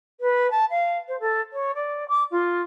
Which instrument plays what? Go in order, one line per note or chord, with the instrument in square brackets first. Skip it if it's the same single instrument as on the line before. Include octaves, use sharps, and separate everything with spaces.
[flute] B4
A5
F5
C5
A4
C#5
D5
D6
F4